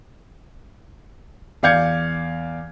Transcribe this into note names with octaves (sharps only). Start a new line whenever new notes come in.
E2 D5 F5 G6 G#6 C#7